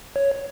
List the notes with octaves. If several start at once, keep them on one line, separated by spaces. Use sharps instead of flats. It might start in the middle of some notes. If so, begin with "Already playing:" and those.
C#5